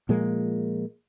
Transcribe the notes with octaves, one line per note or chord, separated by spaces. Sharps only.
A#2 F3 G#3 A#3